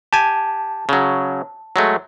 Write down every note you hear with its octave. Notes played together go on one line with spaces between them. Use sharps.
G4 G#5 A5
C#3 F#3
F#3 G#3 A3